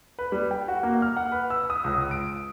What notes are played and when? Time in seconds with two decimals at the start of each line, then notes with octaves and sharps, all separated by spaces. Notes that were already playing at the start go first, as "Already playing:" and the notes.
0.19 B4
0.32 G3
0.51 G5
0.68 F#4
0.83 A#3
1.02 F6
1.17 F#5
1.32 B4
1.50 E6
1.70 D#6
1.84 C#2
2.11 D7